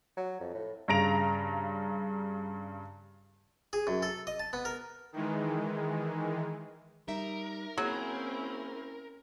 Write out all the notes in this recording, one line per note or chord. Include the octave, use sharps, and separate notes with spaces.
F#3
F2
A2
G2 C#3 A#5 A#6 D7 F7
G#4
F#2
A4
D#5
A5
B3
A#4
D#3 E3 G#3
G3 D#4 A#4 E5
F#3 A#3 C4 C#4 E4 G#4